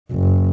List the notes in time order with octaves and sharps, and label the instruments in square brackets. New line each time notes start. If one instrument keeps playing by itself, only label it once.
[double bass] F#1